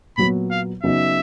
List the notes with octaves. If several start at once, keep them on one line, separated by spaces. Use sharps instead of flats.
A#2 F#3 B3 B5
F5
C#3 F#3 B3 D#4 F#4 E5